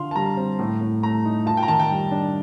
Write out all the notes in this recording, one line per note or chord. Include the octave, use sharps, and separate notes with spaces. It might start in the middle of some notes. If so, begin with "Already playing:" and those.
Already playing: D3 F4 F5 C6
A5
G3 A#5
C4
A2
A2
A3 A#5
D#4
F4 A5
G5
A#5
D#3 A5
G5
G3
D4